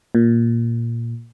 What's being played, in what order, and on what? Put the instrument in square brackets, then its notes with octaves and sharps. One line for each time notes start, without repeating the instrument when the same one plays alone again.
[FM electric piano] A#2